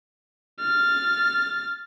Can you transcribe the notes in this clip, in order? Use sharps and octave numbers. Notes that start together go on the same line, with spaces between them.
F6 A6